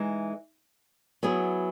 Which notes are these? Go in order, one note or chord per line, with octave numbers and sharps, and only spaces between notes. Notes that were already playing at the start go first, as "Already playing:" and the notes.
Already playing: E3 G#3 D#4
F#3 B3 E4 G#4